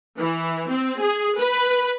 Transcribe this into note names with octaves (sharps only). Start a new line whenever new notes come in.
E3
C4
G#4
B4